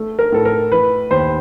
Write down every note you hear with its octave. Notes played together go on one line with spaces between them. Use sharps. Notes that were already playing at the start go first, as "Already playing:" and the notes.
Already playing: A3
A#4
A2 A4
A#4
E3 B4
D#2 C5